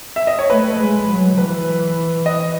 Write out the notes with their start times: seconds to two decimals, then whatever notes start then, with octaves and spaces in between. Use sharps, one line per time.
0.16 E5
0.27 D#5
0.39 C#5
0.50 A3 B4
0.79 G#3
1.09 F#3
1.38 E3 B4
2.26 D#5